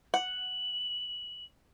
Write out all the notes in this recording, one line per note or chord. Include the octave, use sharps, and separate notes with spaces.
F#5 F#7